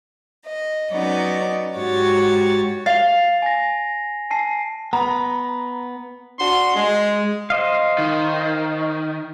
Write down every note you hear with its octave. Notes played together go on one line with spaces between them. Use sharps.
D#5
F#3 B3 C#4 D#4 D5 D#5
G#2 F#4 G4 C#5 A6
F5 A6 C7 F7
G#5 A#6
G#5 A5 C7
B3 A#5
D4 F#4 C6
G#3
C5 D#5 F5
D#3